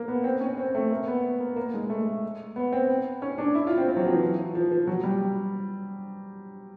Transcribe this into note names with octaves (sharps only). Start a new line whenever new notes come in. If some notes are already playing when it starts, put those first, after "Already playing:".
Already playing: A#3
B3
C4
C#4
C4
A3
A#3
B3
A#3
A#3
G#3
A3
B3
C4
C#4
D4
E4
F4
C4
C4
F#3
F3
E3
F3
F3
F#3
G3